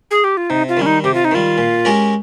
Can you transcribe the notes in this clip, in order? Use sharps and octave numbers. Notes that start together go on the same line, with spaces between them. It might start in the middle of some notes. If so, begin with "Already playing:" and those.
G#4
G4
F4
C3 D#4
F4
D#3 G3 C#4
D#4
C3 G4
F4
D#4
D#3 G3 F4
A#2
G#3 C#4 G4 A#4